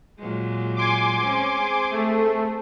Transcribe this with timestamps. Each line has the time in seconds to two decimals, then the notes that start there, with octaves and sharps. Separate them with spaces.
0.19 A#2 F#3 G#3
0.76 G#5 C6 D6
1.21 G#3 C4 C#4
1.60 C4 G#4
1.91 A3